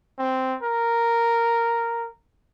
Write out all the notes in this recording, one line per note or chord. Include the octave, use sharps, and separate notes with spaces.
C4
A#4